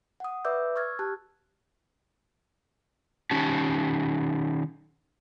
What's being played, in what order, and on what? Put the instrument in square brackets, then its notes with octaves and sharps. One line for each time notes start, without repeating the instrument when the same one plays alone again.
[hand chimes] F#5 D#6
B4 D5 E5 D6 E6 G6
C#6 E6 F6 G#6 A6
G4 A5 F#6
[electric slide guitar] D#3 C#4 D#4 G4 A5